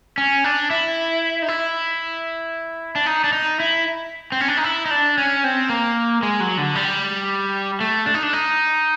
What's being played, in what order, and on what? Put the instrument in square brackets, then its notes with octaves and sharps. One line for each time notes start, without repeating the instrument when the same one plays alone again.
[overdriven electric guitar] C#4
D4
E4
D#4
E4
D4
D#4
D4
D#4
E4
C4
C#4
D4
D#4
E4
D#4
D4
C#4
C4
A#3
G#3
F#3
D3
G3
A3
D4
D#4
D4
D#4